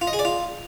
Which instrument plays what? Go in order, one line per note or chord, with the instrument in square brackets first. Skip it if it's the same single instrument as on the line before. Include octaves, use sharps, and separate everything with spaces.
[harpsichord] F4
D#5
G#4
D5
F4